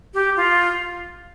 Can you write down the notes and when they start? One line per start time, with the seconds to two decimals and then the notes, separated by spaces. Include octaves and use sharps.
0.14 G4
0.36 F4